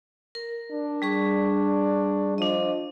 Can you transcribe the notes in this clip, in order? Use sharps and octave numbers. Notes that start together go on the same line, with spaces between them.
A#4
D4
G3 G#4 C#6
F3 D4 D#5